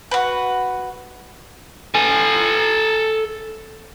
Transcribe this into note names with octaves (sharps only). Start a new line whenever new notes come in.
F#4 B4
A4 G#5